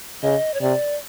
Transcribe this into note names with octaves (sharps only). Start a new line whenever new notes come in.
C#3 D#5
C#5
C3 D5